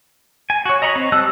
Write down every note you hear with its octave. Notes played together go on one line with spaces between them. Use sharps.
G#5
F#4 C#5
D#5 A#5 B5 C#6
C4
G3 D#5 A5 E6 F#6